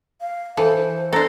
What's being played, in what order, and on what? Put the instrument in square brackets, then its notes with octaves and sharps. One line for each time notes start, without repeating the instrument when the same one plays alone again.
[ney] F5
[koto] E3 [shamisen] A4 [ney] C5
[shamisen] B3 D4 [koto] A4 C5 [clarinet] A#5